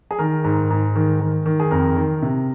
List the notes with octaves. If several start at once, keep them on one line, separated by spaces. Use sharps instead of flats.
G#4
D#3 A#4
G#2
G#2
D#3
D#3
D#3
G#4
F2 A#4
D#3
C3